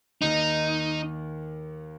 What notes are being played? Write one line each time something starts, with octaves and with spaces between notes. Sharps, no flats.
D#2 D#3 A#3 D#4